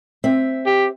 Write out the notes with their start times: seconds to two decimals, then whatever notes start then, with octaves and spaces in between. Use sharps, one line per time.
0.24 C4 E5
0.66 G4